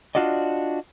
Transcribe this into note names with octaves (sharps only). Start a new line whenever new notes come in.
D4 F4 F#4 D5 D#5